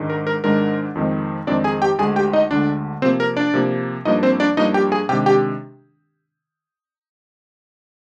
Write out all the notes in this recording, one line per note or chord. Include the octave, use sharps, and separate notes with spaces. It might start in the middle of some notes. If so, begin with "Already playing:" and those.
Already playing: G#2 D#3 G#3 D4
A#4
A#4
G#2 D#3 G#3 D4 A#4
F2 D#3 G#3 C4 D#4
F2 D#3 G#3 C4 D4 D#4 D5
G#4 G#5
G4 G5
D2 D3 G#3 G#4 G#5
G4 G5
D#4 D#5
D2 D3 G#3 D4 D5
C3 F3 A#3 C4 C5
A#4
D4 D5
C3 F3 A#3
G2 F3 A#3 D4 D#4 D#5
C4 C5
D4 D5
G2 F3 A#3 D4 D#4 D#5
G4 G5
G#4 G#5
C3 D#3 G#3 D4 G4 G5
G4 G5